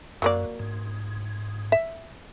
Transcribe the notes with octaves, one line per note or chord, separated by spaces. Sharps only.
F#2 F#3 A#3 D5
G#2
E5